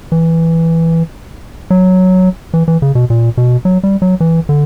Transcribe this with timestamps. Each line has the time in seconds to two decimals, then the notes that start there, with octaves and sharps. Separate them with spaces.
0.12 E3
1.70 F#3
2.54 E3
2.68 E3
2.82 C#3
2.95 B2
3.10 A#2
3.37 B2
3.65 F#3
3.83 G3
4.02 F#3
4.20 E3
4.49 D3